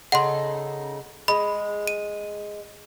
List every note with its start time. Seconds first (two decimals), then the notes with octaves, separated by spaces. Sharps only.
0.12 C#3 D#4 A4 F#5 C6
1.28 G#3 B5
1.87 D#7